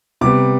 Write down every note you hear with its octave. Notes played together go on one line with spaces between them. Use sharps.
C3 G3 B3 D6